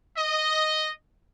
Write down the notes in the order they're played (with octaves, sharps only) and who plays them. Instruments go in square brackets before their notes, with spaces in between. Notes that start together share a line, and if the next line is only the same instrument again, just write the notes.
[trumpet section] D#5